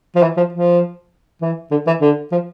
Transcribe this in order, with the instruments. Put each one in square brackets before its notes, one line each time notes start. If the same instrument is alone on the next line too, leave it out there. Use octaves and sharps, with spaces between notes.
[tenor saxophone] F3
E3
F3
F3
E3
D3
E3
D3
F3